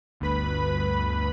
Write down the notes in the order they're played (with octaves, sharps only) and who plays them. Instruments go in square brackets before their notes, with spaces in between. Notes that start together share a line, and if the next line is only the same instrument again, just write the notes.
[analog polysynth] G1 D2 B4 B5